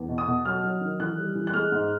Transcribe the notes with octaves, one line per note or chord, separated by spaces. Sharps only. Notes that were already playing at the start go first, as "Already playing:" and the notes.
Already playing: E2
B2
D#6
B2
F#3 F6
F#3
D#3
E3 F#6
G3
E3
F#6
G#3 F6
G#2